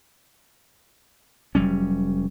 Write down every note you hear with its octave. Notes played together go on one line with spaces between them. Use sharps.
F1 F#3 G3 C#4